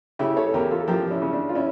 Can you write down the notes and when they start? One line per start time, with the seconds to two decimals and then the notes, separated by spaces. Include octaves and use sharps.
0.19 C#3 E4 G4
0.37 A4 C#5
0.54 E2 G4 A#4
0.71 F4 A4
0.88 F3 G4 A#4
1.11 C#4 E4
1.22 C#3
1.32 D4
1.49 F4
1.55 C#4 E4